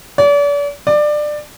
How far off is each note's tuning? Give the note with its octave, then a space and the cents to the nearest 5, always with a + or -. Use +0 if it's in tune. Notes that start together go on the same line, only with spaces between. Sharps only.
D5 -40
D5 +20